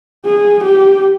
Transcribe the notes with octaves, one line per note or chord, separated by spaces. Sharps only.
G#4
G4